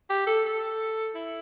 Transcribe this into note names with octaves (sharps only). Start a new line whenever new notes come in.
G4
A4
A4
E4